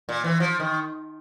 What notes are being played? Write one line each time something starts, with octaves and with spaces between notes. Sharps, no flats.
A#2
E3
F3
D#3